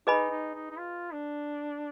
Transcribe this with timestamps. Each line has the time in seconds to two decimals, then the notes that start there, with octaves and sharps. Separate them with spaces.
0.07 D#4 G#4 B4 D#5 G#5 B5
0.31 D#4
0.55 D#4
0.70 D#4
0.78 F4
1.13 D4